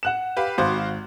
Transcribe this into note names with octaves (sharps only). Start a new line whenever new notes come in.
F#5 F#6 E7
G4 B4 F5
G#1 F#4 C5 F5